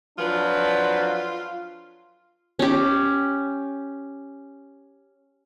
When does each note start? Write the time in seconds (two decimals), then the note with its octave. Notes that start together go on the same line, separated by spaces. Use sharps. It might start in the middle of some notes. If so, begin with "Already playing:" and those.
0.18 F2 F3 F#3 D4 F4 B4
2.59 C#4 G4